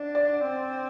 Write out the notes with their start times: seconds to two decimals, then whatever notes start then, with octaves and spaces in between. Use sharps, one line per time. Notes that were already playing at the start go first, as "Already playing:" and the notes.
Already playing: D4 D5
0.15 D5
0.42 C4